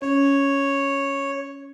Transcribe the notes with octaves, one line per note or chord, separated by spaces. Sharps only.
C#4 C#5